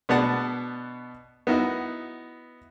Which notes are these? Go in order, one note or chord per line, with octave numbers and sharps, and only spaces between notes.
B2 B3 D4 F#5 A5
B3 D#4 E4 F#4